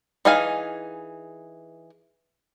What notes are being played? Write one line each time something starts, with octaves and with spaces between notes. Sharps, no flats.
E3 D#4 G#4 F5 G#5